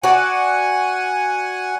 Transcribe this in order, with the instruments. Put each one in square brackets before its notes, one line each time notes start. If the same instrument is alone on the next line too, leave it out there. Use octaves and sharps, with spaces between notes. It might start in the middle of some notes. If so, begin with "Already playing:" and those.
[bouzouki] F#4 D5 [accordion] F#5 G#5